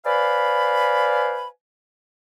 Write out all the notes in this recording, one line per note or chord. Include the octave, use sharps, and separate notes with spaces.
B4 C5 D5 F5 G#5 B5